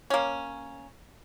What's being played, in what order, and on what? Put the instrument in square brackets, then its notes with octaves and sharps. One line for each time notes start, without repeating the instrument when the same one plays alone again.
[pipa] A#3 C#4